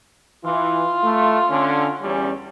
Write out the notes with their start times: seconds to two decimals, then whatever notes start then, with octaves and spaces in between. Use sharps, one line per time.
0.45 E3 F4
1.04 A3
1.49 D3 C#4
2.02 E2 G3 C#4